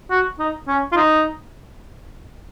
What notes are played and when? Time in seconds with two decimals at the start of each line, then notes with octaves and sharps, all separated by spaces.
0.11 F#4
0.40 D#4
0.68 C#4
0.93 F4
0.97 D#4